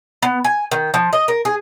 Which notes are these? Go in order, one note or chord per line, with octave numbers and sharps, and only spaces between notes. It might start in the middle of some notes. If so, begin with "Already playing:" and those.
B3
G#5
D#3
F3
D#5
A#4
G#4